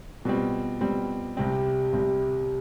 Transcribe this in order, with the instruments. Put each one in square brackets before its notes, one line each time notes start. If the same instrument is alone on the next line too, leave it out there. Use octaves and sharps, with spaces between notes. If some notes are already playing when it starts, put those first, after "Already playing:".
[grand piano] B2 G3 C4 [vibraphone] F4
[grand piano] B2 G3 C4
[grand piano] C2 C3 G3 C4 [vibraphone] G4
[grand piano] C2 C3 G3 C4